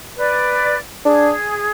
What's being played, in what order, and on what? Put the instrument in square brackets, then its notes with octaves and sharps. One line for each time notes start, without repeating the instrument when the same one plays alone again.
[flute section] B4 D5
[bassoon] D4 [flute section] G#4